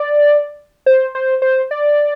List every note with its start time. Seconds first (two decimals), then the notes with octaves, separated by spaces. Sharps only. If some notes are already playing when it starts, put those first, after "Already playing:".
Already playing: D5
0.86 C5
1.15 C5
1.42 C5
1.71 D5